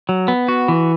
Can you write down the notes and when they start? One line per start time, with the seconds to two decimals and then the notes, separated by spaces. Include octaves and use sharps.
0.09 F#3
0.28 B3
0.48 F#4
0.68 E3